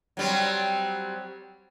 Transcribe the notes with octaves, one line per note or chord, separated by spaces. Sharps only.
F#3 G3 C4